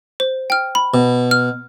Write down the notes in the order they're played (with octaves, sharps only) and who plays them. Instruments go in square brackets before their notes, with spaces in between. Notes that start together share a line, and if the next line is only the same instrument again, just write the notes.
[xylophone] C5
G5 F6
B5
[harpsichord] B2
[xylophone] F6